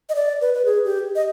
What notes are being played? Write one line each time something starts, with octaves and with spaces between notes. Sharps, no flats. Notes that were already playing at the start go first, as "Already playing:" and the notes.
D#5
D5
B4
B4
G#4
G4
D#5